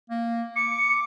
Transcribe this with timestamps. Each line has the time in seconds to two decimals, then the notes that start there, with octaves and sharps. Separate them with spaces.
0.10 A#3
0.56 D6 C#7